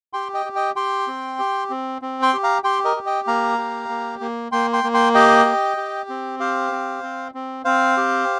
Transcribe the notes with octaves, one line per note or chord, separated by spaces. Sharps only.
G4 G5 C6
D#5 G5
G4
D#5 G5
G4 G5 C6
C4
G4
C4
C4
G5 C6
G4
F5 A#5
G4 G5 C6
A#4 D#5
G4
D#5 G5
A#3 F5 A#5
G4
A#3
A#3
A#3 G5 C6
G5 C6
A#3
G5 C6
G4 D#5 G5
G4
G4
C4
G4 C5 F5
C4
C4
C4
C4 C5 F5
G4